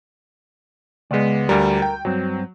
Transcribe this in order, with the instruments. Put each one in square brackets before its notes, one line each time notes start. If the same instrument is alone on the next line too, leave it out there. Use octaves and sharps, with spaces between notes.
[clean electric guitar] C#2 B3 [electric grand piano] G#3 D5
[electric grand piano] D2 G3 [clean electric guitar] A#4
[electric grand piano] G5
[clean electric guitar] G2 C4 [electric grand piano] F#3